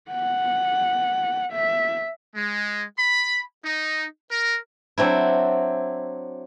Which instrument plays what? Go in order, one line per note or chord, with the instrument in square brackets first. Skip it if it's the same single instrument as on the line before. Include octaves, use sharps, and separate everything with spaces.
[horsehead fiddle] F#5
E5
[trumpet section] G#3
B5
D#4
A#4
[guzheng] F#3 C4 D4 E4